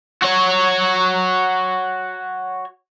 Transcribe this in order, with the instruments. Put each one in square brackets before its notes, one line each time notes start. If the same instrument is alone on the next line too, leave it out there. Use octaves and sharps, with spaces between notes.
[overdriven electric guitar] F#4 C#5